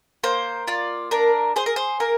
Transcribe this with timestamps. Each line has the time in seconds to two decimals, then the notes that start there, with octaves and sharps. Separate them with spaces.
0.23 A#3 C5
0.67 F4 D5
1.11 D4 A#4
1.56 G#4 C5
1.66 A#4
1.76 C5
2.00 A#3 A#4